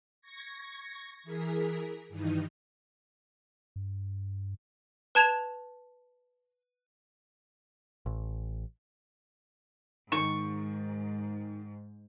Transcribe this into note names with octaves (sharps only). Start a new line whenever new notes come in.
C#6 G#6 A#6
E3 G#4 A#4 B6
G2 D#3 E3 D#4
G2
B4 A5 G#6 E7 F7
A1
G#2 D#3 C#6